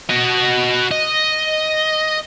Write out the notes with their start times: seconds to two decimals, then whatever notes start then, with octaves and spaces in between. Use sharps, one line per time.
0.10 F#4 D#5
0.91 D#5